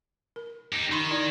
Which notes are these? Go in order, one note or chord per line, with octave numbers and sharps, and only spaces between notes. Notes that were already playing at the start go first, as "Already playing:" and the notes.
A#4
D#4 G4
D#3 D#4 C6 C#6
E4 D5